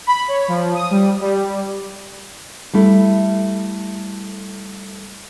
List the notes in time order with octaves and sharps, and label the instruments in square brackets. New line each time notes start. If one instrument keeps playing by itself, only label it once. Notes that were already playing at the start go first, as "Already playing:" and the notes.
[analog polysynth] B5
C#5
F3
D#6
G3
G3
[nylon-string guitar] G3 A3 E4